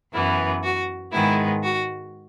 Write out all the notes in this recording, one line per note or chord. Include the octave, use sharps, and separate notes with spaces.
F#2 E3 B3 E4
F#4
G#2 D#3 G#3 B3 E4
F#4